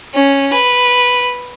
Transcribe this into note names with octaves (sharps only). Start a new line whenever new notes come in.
C#4
B4